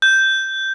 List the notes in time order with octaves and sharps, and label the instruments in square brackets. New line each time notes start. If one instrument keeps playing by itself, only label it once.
[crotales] G6